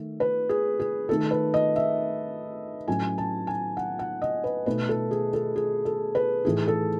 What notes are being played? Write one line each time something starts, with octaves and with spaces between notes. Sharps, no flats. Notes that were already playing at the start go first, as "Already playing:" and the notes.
Already playing: D#3 A3
B4
G#4
G#4
D#3 A3 D#4 A4
B4
D#5
E5
A2 F#3 C#4 G#5
A5
G#5
F#5
F#5
D#5
B4
B2 A3 D#4 B4
A4
G#4
A4
G#4
A4
B4
A2 E3 A3 D#4 G#4
A4